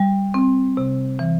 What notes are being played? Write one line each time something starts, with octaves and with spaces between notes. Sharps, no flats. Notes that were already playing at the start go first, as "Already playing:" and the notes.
Already playing: G3
C4
C3
E3